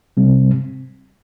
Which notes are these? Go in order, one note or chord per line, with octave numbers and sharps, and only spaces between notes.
C3 G3 C4